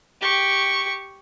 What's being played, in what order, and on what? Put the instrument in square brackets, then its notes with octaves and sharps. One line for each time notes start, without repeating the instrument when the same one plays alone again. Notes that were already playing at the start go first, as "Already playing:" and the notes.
[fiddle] G4 C#6